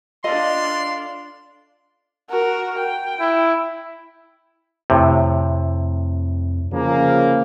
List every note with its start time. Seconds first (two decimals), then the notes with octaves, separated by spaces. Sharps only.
0.24 D4 F4 A4 D5 D#5 F5 C6
2.30 F#4 A#4
2.78 G5
3.20 E4
4.90 F2 A2 C3
6.73 C#3 F3 A#3